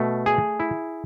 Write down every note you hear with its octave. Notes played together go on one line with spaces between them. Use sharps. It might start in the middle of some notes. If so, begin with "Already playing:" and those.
Already playing: B2 A3
G#4
E4